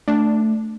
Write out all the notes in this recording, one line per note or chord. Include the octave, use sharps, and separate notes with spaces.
A3 D4